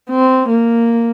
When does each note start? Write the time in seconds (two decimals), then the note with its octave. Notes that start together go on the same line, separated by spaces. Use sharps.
0.10 C4
0.49 A#3